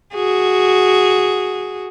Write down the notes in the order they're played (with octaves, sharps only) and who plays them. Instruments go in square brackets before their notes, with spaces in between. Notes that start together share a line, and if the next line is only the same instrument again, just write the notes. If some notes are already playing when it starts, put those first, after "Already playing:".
[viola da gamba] F#4 G#4